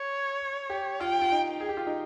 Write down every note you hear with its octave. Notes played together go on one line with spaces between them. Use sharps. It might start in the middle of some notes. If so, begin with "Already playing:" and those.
Already playing: C#5
G4
F4 G5
F4
D#4
G#4
G4
F4
D#4